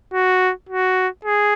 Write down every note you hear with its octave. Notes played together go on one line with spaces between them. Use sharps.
F#4
F#4
G#4